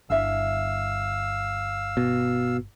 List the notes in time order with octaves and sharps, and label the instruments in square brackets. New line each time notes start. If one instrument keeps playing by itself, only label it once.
[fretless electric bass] G1 D4 [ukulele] E4 E5 A5 [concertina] F5 E6
[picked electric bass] B2